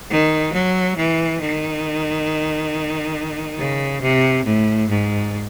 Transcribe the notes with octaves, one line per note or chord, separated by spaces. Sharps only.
D#3
F#3
E3
D#3
C#3
C3
A2
G#2